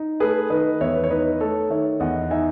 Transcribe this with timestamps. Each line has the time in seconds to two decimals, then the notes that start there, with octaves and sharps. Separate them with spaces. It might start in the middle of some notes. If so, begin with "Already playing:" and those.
Already playing: D#4
0.20 A3 G#4 B4
0.50 D#3 B4 D#5
0.81 E2 C#5 E5
0.96 B4
1.04 C#5
1.10 D#4 B4 D#5
1.40 A3 A4 C#5
1.70 D#3 C#5 E5
2.00 E2 D#5 F#5
2.30 D#4 E5 G#5